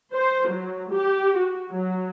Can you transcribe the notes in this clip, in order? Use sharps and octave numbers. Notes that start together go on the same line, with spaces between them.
C5
F#3
G4
F#4
F#3